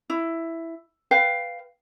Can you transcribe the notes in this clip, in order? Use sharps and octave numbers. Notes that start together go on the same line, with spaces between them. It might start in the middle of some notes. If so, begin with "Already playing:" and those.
E4
B4 F5 G5